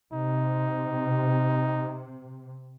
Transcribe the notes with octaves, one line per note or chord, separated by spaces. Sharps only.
C3 D#4